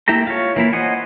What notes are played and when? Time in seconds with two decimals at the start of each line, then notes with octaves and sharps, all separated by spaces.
0.08 A#3 E4 G4 A4 A#5
0.27 F4 C#5
0.56 E3 A#3 E4
0.73 C5 D#5 F#5 G#5